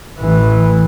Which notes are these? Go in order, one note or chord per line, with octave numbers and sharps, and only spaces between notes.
A1 E3